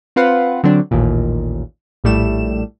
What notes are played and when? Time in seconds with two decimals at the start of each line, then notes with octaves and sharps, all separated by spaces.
0.16 C4 F4 B4 F5 F#5
0.63 D3 F#3 C4 D4
0.91 A1 D#2 A#2
2.04 A#1 A2 G3 A3 E7